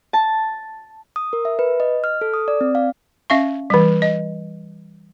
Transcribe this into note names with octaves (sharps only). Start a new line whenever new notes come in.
A5
D#6
A#4
E5
B4
D#5
F6
A4
D#6
D5
C4
F5
C#4 E5 F5 C#6
E3 G3
D#5